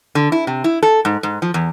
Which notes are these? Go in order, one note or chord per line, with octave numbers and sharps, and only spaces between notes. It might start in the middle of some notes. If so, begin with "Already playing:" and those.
D3
E4
C3
E4
A4
G#2
G#2
F3
E2